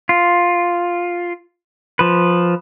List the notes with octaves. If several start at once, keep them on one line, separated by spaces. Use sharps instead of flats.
F4
F3 B4